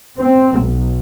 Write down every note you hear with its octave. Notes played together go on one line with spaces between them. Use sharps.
C4
B1